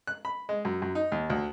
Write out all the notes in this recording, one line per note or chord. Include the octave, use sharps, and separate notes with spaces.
F#6
B5
G#3
F#2
F#2
D#4
D#2
D2